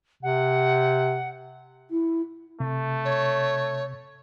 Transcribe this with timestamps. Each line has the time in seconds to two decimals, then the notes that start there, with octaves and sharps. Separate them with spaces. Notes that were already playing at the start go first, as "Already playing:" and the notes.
0.23 C3 F#5
1.90 E4
2.60 C3 A3
3.04 C#5